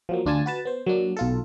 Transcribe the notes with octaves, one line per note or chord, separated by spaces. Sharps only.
F3 F#3 A#3
D2 D4 F4 G#5 A5
F#4 B4 A5
B3 C5
F#3 A#3 D4
B1 F4 A4